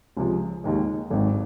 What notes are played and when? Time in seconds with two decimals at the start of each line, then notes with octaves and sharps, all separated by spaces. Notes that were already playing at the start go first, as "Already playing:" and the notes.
0.17 C#2 C3 F3 G#3
0.64 D#2 D#3 G#3
1.11 G#1 G#2 D#3